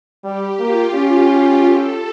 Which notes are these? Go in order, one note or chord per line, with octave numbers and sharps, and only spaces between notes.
G3 G4
A#3 F4
C#4 G4
A4